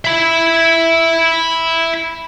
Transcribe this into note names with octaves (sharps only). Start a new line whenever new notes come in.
E5 B5